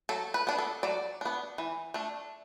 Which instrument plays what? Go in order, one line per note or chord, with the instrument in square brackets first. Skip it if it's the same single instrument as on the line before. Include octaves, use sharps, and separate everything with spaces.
[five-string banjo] F#3 A4
B4
B3 D4
A4
F#3 D5
B3 D4
E3
A3 D4